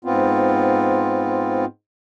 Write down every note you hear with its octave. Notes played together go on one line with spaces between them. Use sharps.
G#2 B3 C4 F4